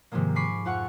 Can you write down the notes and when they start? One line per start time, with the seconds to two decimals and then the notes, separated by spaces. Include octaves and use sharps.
0.12 G#2 C3 D#3 F3 G#3 A#3
0.35 G#5 B5 C#6 D6 B6 C7
0.65 F2 F4 F#5 C#6